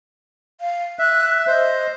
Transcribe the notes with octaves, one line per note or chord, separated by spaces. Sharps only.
F5
E5 F#6
C5 D#5